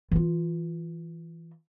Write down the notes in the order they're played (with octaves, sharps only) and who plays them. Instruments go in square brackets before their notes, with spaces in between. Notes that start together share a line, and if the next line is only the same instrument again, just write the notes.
[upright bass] E3 F4